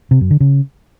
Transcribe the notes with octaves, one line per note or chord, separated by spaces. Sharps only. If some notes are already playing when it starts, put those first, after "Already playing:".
C3
F#2
D3
C#3